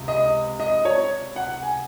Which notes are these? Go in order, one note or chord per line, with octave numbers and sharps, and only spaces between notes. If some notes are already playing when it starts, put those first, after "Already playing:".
Already playing: C#2 C3
D#5
D#5
C#5
F#5
G#5